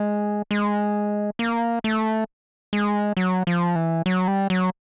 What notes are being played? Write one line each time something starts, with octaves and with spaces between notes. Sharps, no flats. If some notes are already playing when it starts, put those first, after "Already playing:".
Already playing: G#3
G#3
A#3
A3
G#3
F#3
F3
E3
F#3
G3
F#3